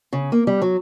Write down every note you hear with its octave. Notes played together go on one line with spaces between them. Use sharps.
C#3
A#3
G3
F#3